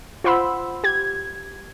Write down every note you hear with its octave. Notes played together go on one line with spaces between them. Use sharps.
F4 C5 F#5 B5 C6 E6
G4 G#6